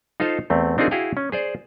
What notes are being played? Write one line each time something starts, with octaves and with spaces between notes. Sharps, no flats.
D#4 F4 A4 C5 F5
E2 A3 C4
C4 D4 D#4 F4 G#4 A#4
E4 F#4 G#4 F5 G5
C#4
G#4 C5 D5